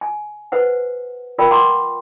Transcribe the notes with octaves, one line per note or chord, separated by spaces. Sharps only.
G#5
B4 C5 F#5
F4 A#4 D5 G5 B5
F#5 A#5 C6 D6